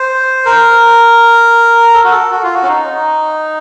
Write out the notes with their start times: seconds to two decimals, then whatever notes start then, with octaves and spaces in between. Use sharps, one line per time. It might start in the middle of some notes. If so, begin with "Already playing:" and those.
Already playing: C5
0.45 A#4
1.94 A4
2.04 F#4
2.12 A4
2.31 F#4
2.43 F4
2.55 F#4
2.63 C#4
2.68 D#4